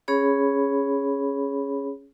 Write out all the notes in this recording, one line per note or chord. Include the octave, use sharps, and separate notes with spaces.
C#4 G#4 C#5 B5